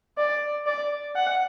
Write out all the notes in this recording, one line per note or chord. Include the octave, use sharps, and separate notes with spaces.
D5
D5
F#5